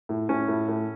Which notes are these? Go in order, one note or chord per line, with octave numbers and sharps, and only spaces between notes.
A2
A2 C#4
A2
A2